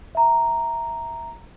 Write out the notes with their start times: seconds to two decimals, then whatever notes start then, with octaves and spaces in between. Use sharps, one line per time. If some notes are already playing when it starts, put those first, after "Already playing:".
0.15 E5 A#5